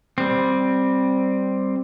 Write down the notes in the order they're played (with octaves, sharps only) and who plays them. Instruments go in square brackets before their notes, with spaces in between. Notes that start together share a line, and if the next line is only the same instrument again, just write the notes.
[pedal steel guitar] G3 C4